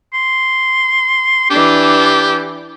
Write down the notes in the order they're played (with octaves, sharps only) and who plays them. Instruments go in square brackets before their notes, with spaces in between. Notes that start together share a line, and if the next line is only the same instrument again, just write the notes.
[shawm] C6
[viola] E3 D4 [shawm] G4